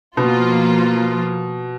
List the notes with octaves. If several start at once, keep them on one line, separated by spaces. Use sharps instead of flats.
B2 F3 A#3 F4